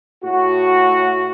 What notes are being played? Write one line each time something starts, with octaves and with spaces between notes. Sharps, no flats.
A2 F#4